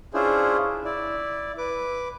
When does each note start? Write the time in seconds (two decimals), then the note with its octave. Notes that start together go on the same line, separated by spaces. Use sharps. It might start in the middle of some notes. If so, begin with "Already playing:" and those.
0.14 C#4 D4 E4 F4 G#4 C5
0.85 E4 D5
1.58 B4 D6